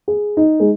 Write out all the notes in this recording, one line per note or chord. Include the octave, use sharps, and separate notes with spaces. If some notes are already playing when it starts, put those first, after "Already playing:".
G#4
D#4
G#3